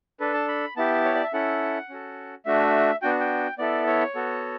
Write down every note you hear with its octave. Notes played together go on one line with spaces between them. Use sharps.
D4 A4 B4
A5
B5
B3 E4 G4 A5
C#5
D5
E5
C#4 E4 A4 F#5
C#4 F#4 A4
A3 D4 F#4 E5
B3 D4 F#4 G5
G5
B3 E4 A4 D5
C#5
B3 F#4 A4